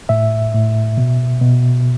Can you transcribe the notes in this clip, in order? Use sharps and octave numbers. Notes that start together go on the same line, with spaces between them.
A2 E5
A2
B2
B2